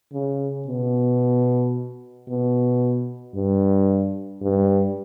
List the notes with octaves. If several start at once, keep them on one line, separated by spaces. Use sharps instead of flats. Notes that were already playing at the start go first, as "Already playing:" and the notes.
C#3
B2
B2
G2
G2